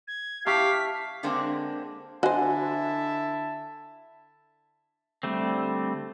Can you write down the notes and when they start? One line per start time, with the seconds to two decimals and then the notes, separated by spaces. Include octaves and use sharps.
0.08 G#6
0.46 G4 E5 F5 A5 C#6 B6
1.23 D3 G#3 A#3 C4 D4
2.23 D3 E4 F#4 C5 D#5 E5 G#5 A5
5.23 D3 G3 A3 C4